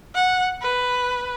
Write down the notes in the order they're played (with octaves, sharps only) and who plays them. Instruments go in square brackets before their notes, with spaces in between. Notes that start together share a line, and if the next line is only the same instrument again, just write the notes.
[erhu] F#5
B4